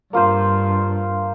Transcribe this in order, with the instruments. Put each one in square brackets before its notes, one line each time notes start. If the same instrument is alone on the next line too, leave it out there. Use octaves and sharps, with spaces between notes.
[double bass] G2 [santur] A#3 F4 C5 F5